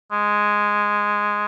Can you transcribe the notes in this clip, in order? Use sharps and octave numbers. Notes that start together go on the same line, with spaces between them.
G#3